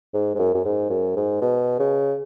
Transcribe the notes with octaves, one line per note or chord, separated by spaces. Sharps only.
G#2
G#2
F#2
F#2
G#2
F#2
G#2
B2
C#3